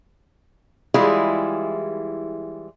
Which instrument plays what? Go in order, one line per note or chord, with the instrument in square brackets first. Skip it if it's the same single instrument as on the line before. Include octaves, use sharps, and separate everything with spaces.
[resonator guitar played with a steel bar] E3 G3 G#3 E4 F4 G#4